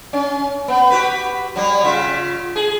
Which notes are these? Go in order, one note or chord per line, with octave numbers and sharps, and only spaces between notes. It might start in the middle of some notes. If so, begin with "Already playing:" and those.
C#4
B3
F#4 G4 B4
F#3 G3
C#3 F4 E5
G#4